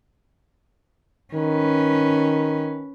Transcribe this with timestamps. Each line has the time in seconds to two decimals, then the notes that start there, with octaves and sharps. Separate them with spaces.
1.34 D#3 C#4 B4